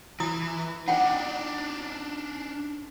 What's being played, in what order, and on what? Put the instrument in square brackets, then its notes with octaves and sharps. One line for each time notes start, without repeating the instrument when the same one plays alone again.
[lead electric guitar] E3 [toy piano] E4 D#6
[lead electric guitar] D4 D#4 [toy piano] F#5 G5